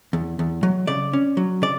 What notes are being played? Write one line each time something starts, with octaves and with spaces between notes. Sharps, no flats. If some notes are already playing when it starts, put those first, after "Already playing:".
E2
E2
F#3
C#3 D5
C#4
F#3
C#3 D5